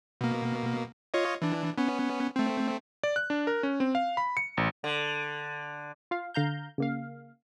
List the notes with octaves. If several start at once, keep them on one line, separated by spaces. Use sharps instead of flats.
B2 A#3
F4 C#5 D#5
E3 D4
B3 C#4
A3 C4
D5
F#6
D4
A#4
C#4
C4
F5
B5
C#7
A1
D3
F4 F5
D3 F5 A#5 G6
C#3 A#3 F5